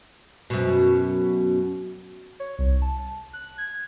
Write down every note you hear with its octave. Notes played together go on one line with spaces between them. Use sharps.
F#2 B2
C#5
C2
A5
F#6
G#6